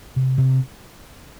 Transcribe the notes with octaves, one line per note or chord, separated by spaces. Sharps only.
C3
C3